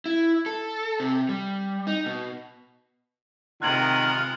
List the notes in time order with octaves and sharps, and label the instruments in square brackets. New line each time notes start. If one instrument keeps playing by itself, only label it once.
[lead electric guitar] E4
A4
C3
G3
D#4
B2
[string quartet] C3 G#3 B3 [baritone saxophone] D#3 [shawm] F4 [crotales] F#6 G#6 F#7